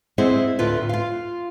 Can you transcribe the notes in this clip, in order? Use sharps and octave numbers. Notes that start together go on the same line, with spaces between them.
G#3 C4 E4 G#4 C5 F#5
D2 A2 F4 B4
F4 F5